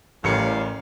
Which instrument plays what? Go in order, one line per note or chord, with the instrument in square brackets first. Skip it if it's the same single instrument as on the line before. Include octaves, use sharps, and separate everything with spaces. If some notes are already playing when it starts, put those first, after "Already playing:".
[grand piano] A1 A#4 C#7 [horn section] A2 G3 F5